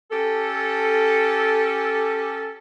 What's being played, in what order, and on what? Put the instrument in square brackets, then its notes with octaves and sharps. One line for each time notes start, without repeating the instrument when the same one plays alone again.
[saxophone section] C#4 G4 A4